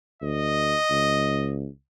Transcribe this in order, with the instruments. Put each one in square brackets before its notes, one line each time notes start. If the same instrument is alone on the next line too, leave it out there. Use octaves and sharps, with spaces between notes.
[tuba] D2 [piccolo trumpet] D#5
[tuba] C#2